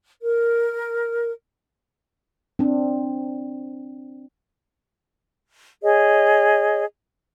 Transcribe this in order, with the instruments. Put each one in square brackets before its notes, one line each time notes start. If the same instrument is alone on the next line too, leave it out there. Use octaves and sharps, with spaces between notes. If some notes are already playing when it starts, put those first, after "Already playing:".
[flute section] A#4
[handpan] C4 D4
[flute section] G#4 C#5 D#5